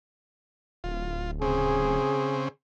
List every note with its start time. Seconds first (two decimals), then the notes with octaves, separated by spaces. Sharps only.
0.84 D1 F4
1.42 C#3 C4 G#4